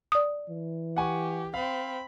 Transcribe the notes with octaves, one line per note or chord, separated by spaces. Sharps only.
D5 D#6
E3
G4 F#5 G#5 C#6
C4 F5 B5